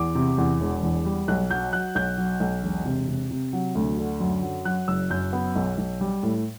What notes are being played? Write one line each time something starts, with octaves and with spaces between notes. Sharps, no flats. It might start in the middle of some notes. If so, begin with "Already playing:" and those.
Already playing: E2 D6
C3
E2
E1
E2
G3
B1 F#6
F#3 G6
F#3 F#6
B1 G6
F#3
B1
E1
C3
C3
C3
F#3
D2
D3
F#2
F#3
F#3 F#6
F#1 E6
F#2 G6
B3
B1
B1
G3
A2